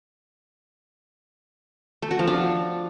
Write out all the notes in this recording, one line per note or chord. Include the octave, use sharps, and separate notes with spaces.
A3
F#4
F3
D4